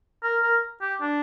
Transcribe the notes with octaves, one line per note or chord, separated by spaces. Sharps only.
A#4
A#4
G4
D4